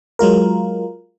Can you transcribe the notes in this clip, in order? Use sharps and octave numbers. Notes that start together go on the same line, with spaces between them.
F#3 G#3 F4 A#4